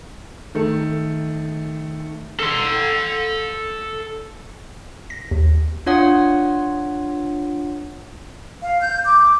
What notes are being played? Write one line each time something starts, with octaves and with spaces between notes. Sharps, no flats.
D#3 A3
A4 C6
A#6
D#2
D4 F4 C#5 F#5 D#6
F5
G6
D6